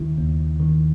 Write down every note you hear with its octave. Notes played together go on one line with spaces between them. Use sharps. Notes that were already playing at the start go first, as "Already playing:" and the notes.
Already playing: D#2 D#3 E4
D#2
D#3